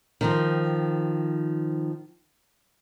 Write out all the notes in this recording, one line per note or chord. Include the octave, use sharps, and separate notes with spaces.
D#3 F3 C4